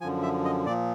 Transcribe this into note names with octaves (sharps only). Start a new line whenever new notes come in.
F#2 D3 F3 G#5
E5
D#5
A#2 F3 D5